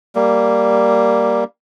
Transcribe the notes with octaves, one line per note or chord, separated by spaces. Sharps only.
G3 A#3